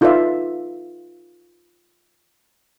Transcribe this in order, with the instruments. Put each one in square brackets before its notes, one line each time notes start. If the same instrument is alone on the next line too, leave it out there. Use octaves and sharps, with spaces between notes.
[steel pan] D#4 F4 A4 B4 D5 E5